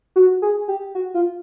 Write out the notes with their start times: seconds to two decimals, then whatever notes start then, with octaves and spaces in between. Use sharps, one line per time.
0.16 F#4
0.42 G#4
0.68 G4
0.95 F#4
1.14 F4